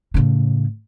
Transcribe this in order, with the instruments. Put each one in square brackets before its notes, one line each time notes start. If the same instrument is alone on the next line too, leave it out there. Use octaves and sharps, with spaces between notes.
[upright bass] A2 C#3